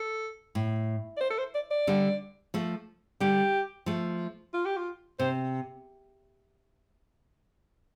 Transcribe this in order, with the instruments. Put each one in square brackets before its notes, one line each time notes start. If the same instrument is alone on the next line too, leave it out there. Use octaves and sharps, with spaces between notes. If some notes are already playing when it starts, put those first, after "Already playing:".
Already playing: [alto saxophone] A4
[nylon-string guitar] A2
[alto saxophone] D5
C5
A4
C5
D5
D5
[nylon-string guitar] D3 G3
F3 A3
[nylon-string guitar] D3 G3 [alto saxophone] G4
[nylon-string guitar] F3 A3
[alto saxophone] F4
G4
F4
[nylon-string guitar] C3 [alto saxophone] C5